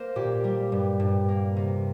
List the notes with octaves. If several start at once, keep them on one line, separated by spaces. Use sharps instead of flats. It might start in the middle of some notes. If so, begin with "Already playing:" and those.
Already playing: A#3 A#4 C5
A#2 G4
G3
G2
G2
A#3
C3